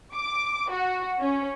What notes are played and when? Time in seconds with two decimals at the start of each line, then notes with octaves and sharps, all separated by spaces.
0.13 D6
0.70 F#4
1.20 C#4